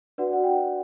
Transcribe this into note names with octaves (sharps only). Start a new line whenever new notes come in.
D4 F#4 B4 D5 F#5
F#5
G5